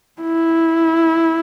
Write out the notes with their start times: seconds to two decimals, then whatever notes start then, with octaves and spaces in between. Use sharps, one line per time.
0.21 E4